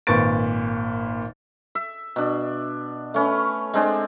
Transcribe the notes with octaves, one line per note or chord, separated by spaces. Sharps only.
G#1 A#2 B4 C#6 A6 D7
E5
B2 D4
A3 C#4 B4
G#3 C4 D4 G#4